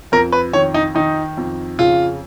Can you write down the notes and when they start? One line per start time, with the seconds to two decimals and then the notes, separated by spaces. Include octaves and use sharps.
0.12 F2 A#4
0.32 B4
0.53 D#3 C#5
0.74 D#4
0.95 D#3 D#4
1.37 F2
1.79 C#3 F4